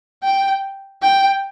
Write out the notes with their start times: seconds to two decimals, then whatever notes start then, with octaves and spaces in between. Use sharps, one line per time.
0.24 G5
1.02 G5